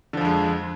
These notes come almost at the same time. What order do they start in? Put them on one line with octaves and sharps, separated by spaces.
D3 F3 F2 G#3